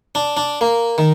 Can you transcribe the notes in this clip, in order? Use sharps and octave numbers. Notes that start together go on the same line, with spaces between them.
D4
D4
A#3
D#3